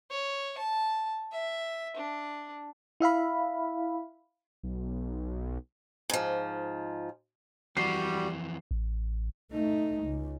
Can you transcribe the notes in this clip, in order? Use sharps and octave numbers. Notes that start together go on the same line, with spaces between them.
C#5
A5
E5
D4
E4 E5 F5 B5
B1
G#2 F3
F2 E3 G3 F#4 C7
A1
A3 D#4
C#2